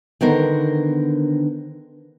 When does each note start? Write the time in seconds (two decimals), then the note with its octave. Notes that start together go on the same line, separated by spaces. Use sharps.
0.21 D3 D#3 B3 A#4 C5